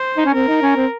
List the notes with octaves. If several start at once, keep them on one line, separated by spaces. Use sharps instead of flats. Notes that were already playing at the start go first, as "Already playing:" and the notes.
Already playing: C5
D#4
C#4
C4 A#4
D#4
C#4
C4